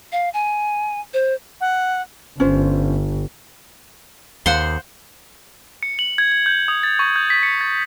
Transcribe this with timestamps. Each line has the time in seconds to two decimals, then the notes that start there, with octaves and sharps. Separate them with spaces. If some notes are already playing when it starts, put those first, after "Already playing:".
0.12 F5
0.34 G#5
1.14 C5
1.61 F#5
2.40 G1 C#4 F4 C5
4.46 D#2 C5 F5 F#5 C6
5.83 C#7
5.99 F#7
6.18 G#6
6.32 G#6
6.46 G6
6.68 D#6
6.83 A6
6.99 C#6
7.16 G6
7.30 B6
7.43 C#7
7.61 A6